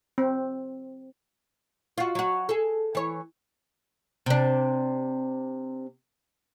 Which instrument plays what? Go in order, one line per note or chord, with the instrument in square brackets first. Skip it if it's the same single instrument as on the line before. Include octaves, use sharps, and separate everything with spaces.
[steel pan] C4
[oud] F4 F#4
F#3 F#4
G#4 A4
E3 C#5
C3 D4